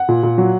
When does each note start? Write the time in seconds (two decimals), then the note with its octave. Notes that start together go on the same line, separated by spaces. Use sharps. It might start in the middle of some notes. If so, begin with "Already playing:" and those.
Already playing: F#5
0.09 A#2
0.23 A#2
0.38 F#3